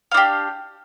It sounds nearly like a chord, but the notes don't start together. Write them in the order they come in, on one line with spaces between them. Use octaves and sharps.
F5 D4 G4